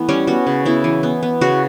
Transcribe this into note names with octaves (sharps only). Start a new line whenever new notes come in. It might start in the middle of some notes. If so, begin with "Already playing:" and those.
Already playing: E3 A3 B3
G3 C#4
B3 F#4
C#3
B3 E4
E3
B3
B3
C#3 F#4